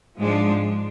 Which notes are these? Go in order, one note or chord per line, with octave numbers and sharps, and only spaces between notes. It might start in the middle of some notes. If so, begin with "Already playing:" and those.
G#2 F3 G#3 D4